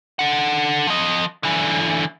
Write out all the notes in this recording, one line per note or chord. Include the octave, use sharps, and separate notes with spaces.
A4 F#5
F3 D#5
D3 E3